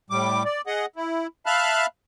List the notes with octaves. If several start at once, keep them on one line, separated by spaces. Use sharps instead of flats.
A2 G3 D6
D5
G#4 D#5 F#5
E4
E5 F5 A5 B5 F6 F#6